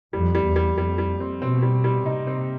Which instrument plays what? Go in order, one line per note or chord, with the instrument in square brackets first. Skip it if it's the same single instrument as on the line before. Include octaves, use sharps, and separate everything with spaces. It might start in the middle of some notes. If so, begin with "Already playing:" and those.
[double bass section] F2 [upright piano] G3
[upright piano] G3
[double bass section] E2
[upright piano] G3
[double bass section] F2 [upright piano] G3
[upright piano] G3
C4
[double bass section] B2 [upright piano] C4
[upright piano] G3
G3
[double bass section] C3 [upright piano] D#4
[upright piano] C4